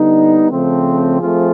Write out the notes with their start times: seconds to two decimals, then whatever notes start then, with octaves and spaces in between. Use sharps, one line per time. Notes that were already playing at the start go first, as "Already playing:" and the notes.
Already playing: D3 G3 B3 D#4
0.50 C#3 F3 A3 C4
1.20 F3 A3 C4 F4 G#4